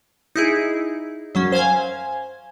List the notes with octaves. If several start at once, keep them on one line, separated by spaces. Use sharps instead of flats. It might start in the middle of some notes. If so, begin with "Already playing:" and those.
D#4 E4 G#4
F#2 F#3 C#4
C5 F5 G#5 G#6